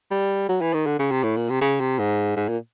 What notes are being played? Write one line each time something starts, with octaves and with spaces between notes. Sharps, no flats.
G3
F#3
E3
D#3
D3
C#3
C3
A2
A#2
C3
C#3
C3
G#2
G#2
A#2